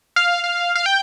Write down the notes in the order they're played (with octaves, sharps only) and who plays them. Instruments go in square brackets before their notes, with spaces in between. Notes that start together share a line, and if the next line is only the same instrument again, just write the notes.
[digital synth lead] F5
F5
F5
G5